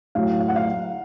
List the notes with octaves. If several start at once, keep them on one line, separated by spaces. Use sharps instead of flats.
A2 F#3 F5
F5
F#5
F5